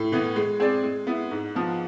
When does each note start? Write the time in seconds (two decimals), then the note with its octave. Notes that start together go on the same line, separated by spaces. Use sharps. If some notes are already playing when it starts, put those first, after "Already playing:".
Already playing: A2
0.12 E3 B3
0.36 G#3
0.60 C4 G#4 D5
0.83 G#3
1.07 B3 E4
1.31 G#2
1.55 F3 B3